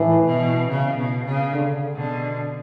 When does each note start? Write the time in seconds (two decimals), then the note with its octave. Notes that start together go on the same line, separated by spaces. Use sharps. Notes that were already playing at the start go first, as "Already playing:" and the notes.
Already playing: A2 E3
0.26 B2
0.69 C#3
0.97 B2
1.25 C#3
1.53 D3
1.95 B2 D3